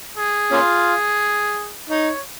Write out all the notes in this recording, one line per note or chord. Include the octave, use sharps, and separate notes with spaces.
G#4
A#3 C#4 F4
D#4 C#5